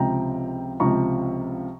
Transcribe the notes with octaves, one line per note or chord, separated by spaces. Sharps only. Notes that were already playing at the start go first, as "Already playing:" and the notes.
Already playing: C#2 C3 F3 G5 A#5
C#2 C3 F3 A#5 C#6